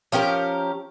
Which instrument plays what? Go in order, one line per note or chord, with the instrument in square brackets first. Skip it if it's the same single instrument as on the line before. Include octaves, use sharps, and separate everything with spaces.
[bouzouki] F3 C#4 G4 A#4